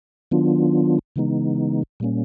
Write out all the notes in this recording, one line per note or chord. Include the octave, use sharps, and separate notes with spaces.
D#3 F#3 B3 D4 F4
C#3 E3 G#3 B3 D#4
A#2 G3 A#3 C#4